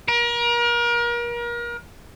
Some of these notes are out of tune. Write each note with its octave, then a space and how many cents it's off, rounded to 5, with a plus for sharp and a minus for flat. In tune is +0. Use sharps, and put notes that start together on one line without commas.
A#4 +35